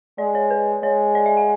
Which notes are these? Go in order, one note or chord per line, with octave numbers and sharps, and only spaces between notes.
G#3 D5
C#5
B4
G#3 C#5
D5
E5
F#5